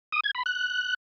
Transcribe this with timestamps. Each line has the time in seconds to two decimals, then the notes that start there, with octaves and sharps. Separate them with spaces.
0.12 D#6
0.24 G#6
0.35 B5
0.46 F#6